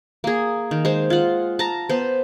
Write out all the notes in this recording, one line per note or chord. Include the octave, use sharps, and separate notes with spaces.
A#3 G#4
D#3
G#3 C5
F4 F#5
A5 A#5
B3 C5